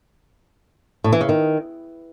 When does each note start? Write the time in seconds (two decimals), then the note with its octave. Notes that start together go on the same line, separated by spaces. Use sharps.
1.04 A2
1.13 E3
1.21 C#3
1.29 D#3